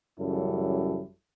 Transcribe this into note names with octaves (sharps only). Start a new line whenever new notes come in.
A1 F#2 C#3 G3 E4 A4